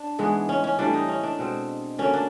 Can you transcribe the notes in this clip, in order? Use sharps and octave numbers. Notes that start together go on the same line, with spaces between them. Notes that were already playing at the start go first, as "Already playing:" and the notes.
Already playing: D4
G#2 E3 G#3 B3
C#4
C#4
A2 E3 G3 D4
D#4
C#4
D4
B2 G#3 C4
D3 F#3 A#3 C#4
D4